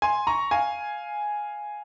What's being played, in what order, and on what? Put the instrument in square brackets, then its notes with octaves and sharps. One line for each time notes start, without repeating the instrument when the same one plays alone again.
[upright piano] G#5 C6
A#5 C#6
F5 G#5